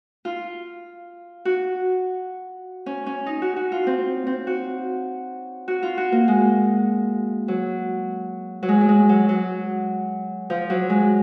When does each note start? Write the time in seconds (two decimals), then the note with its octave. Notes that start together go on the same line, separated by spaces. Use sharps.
0.25 F4
1.45 F#4
2.86 C#4
3.06 C#4
3.26 D#4
3.42 F#4
3.56 F#4
3.72 F4
3.87 C4
4.27 C4
4.47 F#4
5.68 F#4
5.83 F4
5.98 F#4
6.12 A#3
6.28 G#3
7.48 F#3
8.63 F#3
8.69 G#3
8.81 F#3
8.89 G#3
9.09 F#3
9.29 F#3
10.50 F3
10.70 F#3
10.90 G#3